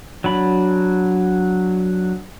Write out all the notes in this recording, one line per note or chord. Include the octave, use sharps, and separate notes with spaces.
F#3 D4 B5